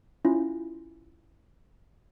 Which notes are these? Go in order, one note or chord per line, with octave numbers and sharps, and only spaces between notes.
C#4 E4 F4